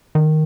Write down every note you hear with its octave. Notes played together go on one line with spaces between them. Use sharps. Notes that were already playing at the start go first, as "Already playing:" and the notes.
D#3